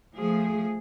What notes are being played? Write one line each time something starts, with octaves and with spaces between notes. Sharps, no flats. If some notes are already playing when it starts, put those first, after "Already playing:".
F3 A3 G#4